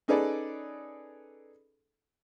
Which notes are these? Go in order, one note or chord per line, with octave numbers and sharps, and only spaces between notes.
C#4 D#4 G#4 A4 B4 D5